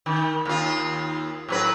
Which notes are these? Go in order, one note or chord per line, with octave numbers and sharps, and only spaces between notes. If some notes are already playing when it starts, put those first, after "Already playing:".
D#3
D#2 F4
A2 F#3 B4